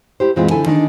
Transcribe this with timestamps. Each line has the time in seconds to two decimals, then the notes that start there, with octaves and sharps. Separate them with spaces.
0.20 E4 G4 C5
0.36 F#2 A#2 E3 G#3 C4 F4
0.51 D3 F3 E4 A4 G#5
0.66 D#3 D4 D#4